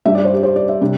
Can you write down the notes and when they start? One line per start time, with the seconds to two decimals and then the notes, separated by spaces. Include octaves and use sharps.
0.05 G2 G3 D4 E5
0.15 D5
0.25 C5
0.34 G4
0.43 C5
0.56 D5
0.69 E5
0.81 C3 G3 D4